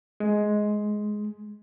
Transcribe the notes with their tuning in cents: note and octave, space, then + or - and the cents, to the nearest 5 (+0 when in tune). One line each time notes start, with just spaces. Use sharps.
G#3 +10